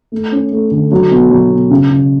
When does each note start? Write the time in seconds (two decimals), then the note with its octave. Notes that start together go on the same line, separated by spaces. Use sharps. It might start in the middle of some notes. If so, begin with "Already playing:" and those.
0.12 A3
0.32 C#4
0.52 A3
0.71 D3
0.92 F#3
1.11 B2
1.31 F#3
1.51 B2
1.70 C#3
1.90 C#3